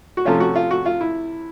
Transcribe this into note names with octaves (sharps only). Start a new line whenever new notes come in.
F#4
C3 F3 A3 C#4 F4
F#4
F4
F#4
F4
E4